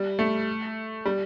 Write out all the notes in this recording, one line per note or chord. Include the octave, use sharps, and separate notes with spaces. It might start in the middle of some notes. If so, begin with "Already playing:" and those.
Already playing: G3
A3
G3